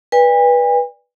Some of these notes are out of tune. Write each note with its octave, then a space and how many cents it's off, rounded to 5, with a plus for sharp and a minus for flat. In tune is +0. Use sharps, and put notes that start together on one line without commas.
B4 -15 D5 +0 G#5 -45